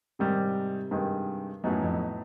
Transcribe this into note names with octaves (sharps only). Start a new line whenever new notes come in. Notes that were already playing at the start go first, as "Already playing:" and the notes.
G#2 C3 D#3 G3
G2 D#3 G#3
F#2 A2 F#3 B3 D#4
F2